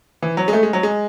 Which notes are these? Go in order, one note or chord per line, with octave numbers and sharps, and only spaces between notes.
E3
F#3
G#3
A3
G#3
F#3
G#3